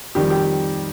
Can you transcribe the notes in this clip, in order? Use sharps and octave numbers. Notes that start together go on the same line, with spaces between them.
F2 D#3 G3 G4
G4